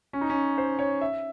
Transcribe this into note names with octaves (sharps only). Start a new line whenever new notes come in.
C#4
D#4
C#4
C5
C#5
E5